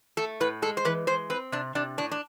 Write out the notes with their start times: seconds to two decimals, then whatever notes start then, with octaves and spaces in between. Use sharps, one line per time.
0.17 A3 A4
0.40 A2 B4
0.62 G#3 A4
0.77 C5
0.85 E3 B4
1.07 G#3 C5
1.30 C4 B4
1.52 C3 D4
1.75 C3 D4
1.98 A2 D4
2.11 D4